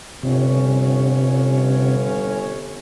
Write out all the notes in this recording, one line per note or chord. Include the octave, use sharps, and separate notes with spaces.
G1 C3 C#4 C#5